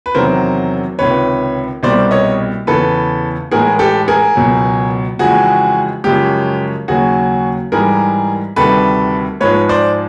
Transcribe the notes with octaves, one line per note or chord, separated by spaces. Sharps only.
B4
E2 C3 D#3 F#3 A#4 C5
C#2 C3 D#3 B4 C#5
C2 B2 G3 C5 D5
C#5 D#5
E2 C#3 E3 A4 B4
A2 E3 G#3 G#4 A#4
G4 A4
G#4 A#4
C#2 B2 F#3
F2 C#3 E3 G#3 F#4 G#4
F#2 C#3 F3 G#3 G4
D#2 C#3 F#3 F#4 G#4
G#2 E3 G3 G#4 A#4
D2 C3 D#3 G3 A4 B4
G#2 F3 G#3 B4 C#5
C5 D5